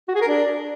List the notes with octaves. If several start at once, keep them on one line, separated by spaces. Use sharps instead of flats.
F#4
G#4
A#4
D4